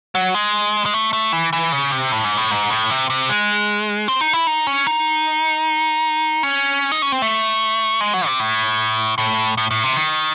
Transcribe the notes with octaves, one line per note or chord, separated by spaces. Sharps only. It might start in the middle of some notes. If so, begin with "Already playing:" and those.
F#3
G#3
G#3
A3
A3
E3
E3
C#3
C3
A2
G#2
A2
G#2
A2
C3
C3
G#3
C4
D#4
E4
D#4
C#4
D#4
C#4
D#4
C#4
C4
A3
G#3
F#3
C3
A2
A2
A2
A2
C3
D#3